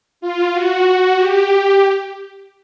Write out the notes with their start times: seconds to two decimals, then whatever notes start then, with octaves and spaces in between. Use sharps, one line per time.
0.21 F4
0.53 F#4
1.17 G4